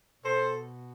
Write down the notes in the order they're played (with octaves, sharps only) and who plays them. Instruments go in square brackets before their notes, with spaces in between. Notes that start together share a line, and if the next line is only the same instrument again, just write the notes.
[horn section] B2 A4 C5